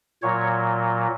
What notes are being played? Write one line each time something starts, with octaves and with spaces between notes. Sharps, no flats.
A#2 F#3 C#5